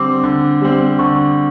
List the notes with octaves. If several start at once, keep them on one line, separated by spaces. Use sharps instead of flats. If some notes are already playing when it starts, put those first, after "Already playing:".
Already playing: D3 G3 C4 D6
D3
G3 C4
D3 C#6